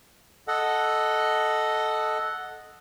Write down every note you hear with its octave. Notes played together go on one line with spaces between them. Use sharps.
A4 D#5 F#5